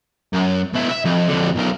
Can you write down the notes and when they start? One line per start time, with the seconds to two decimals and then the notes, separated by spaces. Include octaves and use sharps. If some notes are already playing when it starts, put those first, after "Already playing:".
0.33 F#2
0.74 B2 E4
0.90 E5
1.05 F2
1.29 F2 D3
1.56 B1 A#4